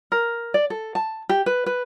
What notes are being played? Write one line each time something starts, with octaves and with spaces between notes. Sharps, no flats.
A#4
D5
A4
A5
G4
B4
B4